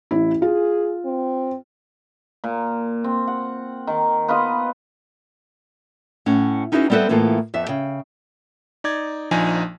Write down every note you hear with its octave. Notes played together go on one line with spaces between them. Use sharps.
A1 E4
F4 G#4
C4
A#2
C4
F#5
D#3
B3 F4 B4 D#5
A2 C#4 F#5
C#4 D#4 E4 F#4 G#4 B4
G3 B3 C4 A4 B4 E5
A2 E3 A#3 B3 F4 A4
F2 B3 E5
C#3 G5
D#4 D5 G#6
A#1 F3 D4 D#4 G#5